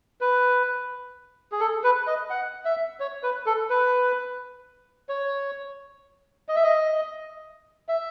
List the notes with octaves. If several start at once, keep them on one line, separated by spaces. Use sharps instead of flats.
B4
G#4
A4
B4
D#5
F#5
E5
C#5
B4
A4
B4
C#5
D#5
E5
D#5
E5